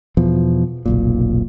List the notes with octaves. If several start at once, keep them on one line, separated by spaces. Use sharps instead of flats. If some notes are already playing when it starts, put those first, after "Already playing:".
E2 B2 F3
F1 B1 A#2